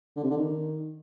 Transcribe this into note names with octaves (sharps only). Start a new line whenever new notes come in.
D3
C3
D3
D#3